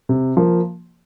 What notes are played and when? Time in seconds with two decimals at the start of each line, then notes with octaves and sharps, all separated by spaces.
0.09 C3
0.37 F3 A#3